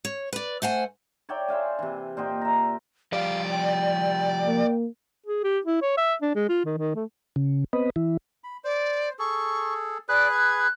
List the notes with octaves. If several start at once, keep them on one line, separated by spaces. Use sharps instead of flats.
C#5
B4 D5
A3 C5 F#5 G#5
C#5 D5 E5 G5
C5 E5 F5 G#5
C3 E3
A#2 C5 D#5 G5
E5 A#5
F3 G3 G4 D5 F5
G5
A#3
G#4
G4
E4
C#5
E5
D4
G#3
F4
D#3
D#3
A3
C#3
B3 C4 B4 D#5
E3 E4
B5
C5 D5
G#4 A4 C#6
G#4 B4 D5 F#6
G#6